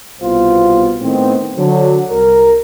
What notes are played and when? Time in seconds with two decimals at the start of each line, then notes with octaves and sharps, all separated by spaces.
0.20 C2 B2 B3 F4 C5
1.00 A2 D#3 B3 C4
1.57 D3 F#3
2.10 C2 A#4